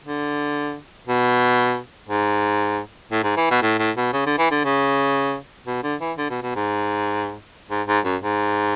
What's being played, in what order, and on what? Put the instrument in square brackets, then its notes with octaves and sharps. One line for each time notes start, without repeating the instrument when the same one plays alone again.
[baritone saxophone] D3
B2
G#2
A2
G#2
E3
B2
A2
A2
B2
C#3
D3
E3
D3
C#3
B2
D3
E3
D3
B2
B2
G#2
G#2
G#2
F#2
G#2